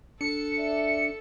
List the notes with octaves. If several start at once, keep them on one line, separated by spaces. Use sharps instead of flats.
D4 A4 C#7
D5 E5